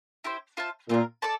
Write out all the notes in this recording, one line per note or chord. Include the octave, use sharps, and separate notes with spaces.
E4 G4 C5
F4 C5 E5 A5
A#2 C4 F4 A#4
A4 D5 A5